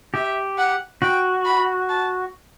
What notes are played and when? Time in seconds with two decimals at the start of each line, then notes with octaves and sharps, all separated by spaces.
0.14 G4 E5
0.58 F#5
1.02 F#4 G5
1.45 B5
1.89 A5